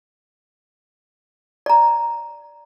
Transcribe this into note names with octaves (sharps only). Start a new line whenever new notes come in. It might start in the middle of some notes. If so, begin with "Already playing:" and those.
D5 A#5